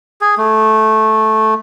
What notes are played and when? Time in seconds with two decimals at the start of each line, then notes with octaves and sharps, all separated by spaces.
0.21 G#4
0.38 A3